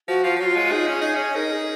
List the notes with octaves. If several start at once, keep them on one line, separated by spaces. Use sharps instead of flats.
F3 F#4
F3 F4
F3
F#3 F4 F#4
G#3
D#4 G#4
C#4
D#4
C#4
D#4 A#4
G#4